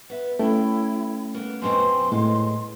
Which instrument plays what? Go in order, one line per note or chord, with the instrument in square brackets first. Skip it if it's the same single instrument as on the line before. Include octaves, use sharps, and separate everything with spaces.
[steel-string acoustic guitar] B3 E5
[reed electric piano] A3 C#4 [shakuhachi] E4 [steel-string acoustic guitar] G5
[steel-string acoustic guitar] A#3 B3
[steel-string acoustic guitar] F#2 B2 C4 [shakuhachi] C6
[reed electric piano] A2 [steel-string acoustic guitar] G#3